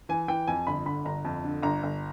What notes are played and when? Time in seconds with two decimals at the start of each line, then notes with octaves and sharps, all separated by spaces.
0.09 E3 G#5
0.28 E3 G5
0.47 F2 G#5
0.67 G1 B5
0.86 D3 B5
1.05 G1 A#5
1.25 F2
1.44 D3
1.63 G1 A#5
1.83 G1